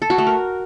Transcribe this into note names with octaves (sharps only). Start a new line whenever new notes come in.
A4
F#4
A3
A#4